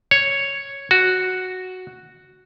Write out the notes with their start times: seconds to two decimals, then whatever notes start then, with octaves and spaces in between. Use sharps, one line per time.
0.11 C#5
0.91 F#4